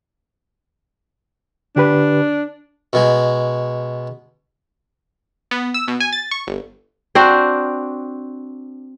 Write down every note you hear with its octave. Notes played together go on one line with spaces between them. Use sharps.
D3 D4 G4 B4
B2 G#3
B3
E6
B2
G#5
A6
C#6
G1
C4 D4 F#4 C5